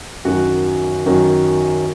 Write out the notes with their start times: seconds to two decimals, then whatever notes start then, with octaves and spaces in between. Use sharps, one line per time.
0.25 F#2 D#3 F#3 F#4
1.06 F#2 D#3 F#3